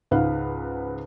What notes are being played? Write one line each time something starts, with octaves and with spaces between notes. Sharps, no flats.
C#2 G#2 B4 F5 F#5